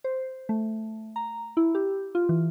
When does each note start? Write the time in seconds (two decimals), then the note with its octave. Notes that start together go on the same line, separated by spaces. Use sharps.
0.04 C5
0.49 A3
1.16 A#5
1.57 E4
1.75 G4
2.15 F4
2.29 E3